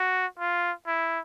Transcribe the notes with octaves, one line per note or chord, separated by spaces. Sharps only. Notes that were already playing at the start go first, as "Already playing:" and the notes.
Already playing: F#4
F4
E4